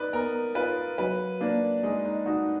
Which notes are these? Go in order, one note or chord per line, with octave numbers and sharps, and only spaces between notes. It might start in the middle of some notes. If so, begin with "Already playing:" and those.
Already playing: D#4 B4 D5
B3 A#4
F4 B4
F#3 B4
A#3 D4
G#3 D#4
D#4
D#4 F#4